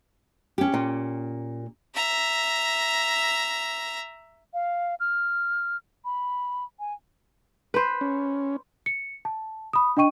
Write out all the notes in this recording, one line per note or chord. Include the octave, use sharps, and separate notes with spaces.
C#4 G4
A#2
E5 A#5
F5
F6
B5
G#5
B4 C5
C#4
C#7
A5
B5 D#6
D4 D#5 G5 C#6 D#7